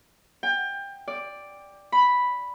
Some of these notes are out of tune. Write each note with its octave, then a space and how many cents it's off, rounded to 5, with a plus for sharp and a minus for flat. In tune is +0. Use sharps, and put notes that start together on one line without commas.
G5 +25
D5 +0
B5 +0